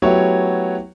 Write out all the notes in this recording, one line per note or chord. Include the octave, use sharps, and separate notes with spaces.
F#3 A3 B3 E4 G4 C#5